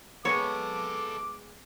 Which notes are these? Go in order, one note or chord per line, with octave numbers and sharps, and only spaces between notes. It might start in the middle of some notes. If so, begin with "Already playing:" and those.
G#3 B3 A4 C#5 D#5 D6